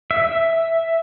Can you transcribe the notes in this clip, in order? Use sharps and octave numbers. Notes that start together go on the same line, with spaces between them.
E5